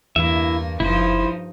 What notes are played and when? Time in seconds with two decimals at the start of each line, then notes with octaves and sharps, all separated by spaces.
0.16 E2 G2 A#3 E4 E5
0.80 F#1 G2 F3 D#4 E4 C5